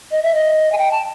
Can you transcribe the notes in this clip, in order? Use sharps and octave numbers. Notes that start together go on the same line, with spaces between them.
D#5
E5
D#5
G#5
G5
A5